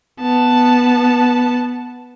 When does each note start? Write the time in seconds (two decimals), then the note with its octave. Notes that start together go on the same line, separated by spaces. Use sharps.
0.21 B3 A5